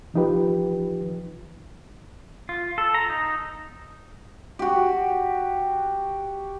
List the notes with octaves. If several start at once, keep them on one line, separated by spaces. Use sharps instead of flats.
E3 F3 D#4 F4 G4 B4
F4
A4
A#5
D#4
F#4 G4